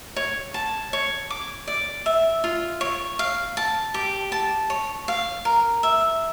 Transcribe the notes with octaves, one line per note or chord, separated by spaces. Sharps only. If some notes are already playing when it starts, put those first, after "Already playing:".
C#5
A5
C#5
D6
D5
E5
F4
C#5
F5
A5
G4
A5
C#5
F5
A#4
E5